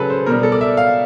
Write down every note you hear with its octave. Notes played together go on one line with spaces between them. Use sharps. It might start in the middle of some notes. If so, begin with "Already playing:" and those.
Already playing: C#3 F#3 G#4 A4 B4
C5
B2 G3 A#4
A4
D5
E5
F5